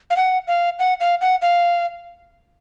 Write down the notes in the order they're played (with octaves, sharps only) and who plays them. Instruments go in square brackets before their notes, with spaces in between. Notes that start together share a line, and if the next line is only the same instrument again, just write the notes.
[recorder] F5
F#5
F5
F#5
F5
F#5
F5